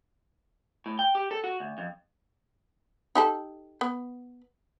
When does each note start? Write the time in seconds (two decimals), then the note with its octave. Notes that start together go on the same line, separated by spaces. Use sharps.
0.86 A2
0.99 G5
1.15 G4
1.31 A4
1.44 F#4
1.60 D2
1.78 F2
3.15 D#4 G4 A4
3.81 B3